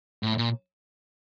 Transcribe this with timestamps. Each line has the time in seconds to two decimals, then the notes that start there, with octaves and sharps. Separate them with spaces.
0.23 A2
0.38 A#2